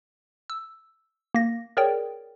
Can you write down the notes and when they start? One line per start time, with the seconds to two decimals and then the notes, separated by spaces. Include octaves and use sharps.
0.50 E6
1.35 A#3 A#6
1.77 G#4 A#4 C#5 D5 G5